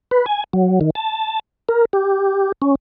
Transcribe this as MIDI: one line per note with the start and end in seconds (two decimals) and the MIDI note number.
0.11 0.26 71
0.26 0.44 80
0.53 0.79 54
0.81 0.90 51
0.95 1.39 81
1.69 1.85 70
1.93 2.52 67
2.62 2.75 61